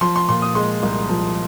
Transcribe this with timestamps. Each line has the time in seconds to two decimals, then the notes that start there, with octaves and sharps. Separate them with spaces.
0.01 F3 C6
0.16 C6
0.29 A#2 C6
0.42 D#6
0.55 G#3 C6
0.83 C2
1.09 F3